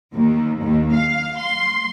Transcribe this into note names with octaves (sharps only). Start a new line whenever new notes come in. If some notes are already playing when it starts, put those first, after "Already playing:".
D#2
D#2
F5
C6